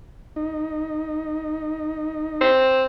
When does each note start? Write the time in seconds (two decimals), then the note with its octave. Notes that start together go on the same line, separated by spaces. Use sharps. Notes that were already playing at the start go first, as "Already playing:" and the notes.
0.36 D#4
2.41 C4